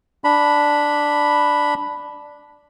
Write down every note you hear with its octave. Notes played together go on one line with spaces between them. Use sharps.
D4 B5